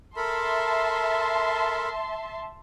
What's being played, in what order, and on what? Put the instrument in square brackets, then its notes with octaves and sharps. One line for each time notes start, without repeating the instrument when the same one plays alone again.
[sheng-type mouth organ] A4 A#4 B5 [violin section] E5 A5 C6